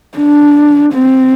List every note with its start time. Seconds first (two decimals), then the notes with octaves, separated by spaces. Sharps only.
0.18 D4
0.94 C4